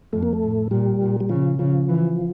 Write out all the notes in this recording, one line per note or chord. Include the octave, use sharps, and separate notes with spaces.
F2 A3
A#3
A3
A2
A#2 G3
A#2
G3
C#3 F3
C#3 F3
E3